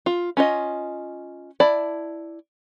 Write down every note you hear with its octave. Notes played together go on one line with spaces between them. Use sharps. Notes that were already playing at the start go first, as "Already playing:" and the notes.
F4
C#4 F4 D#5
E4 D5 A5